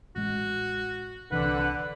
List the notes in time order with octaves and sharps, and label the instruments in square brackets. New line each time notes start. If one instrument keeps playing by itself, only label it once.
[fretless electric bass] A1 G#3 [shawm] F#4
[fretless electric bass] D1 C2 E3 [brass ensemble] D3 [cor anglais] B4 [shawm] F#5